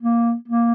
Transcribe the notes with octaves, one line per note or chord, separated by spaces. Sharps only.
A#3
A#3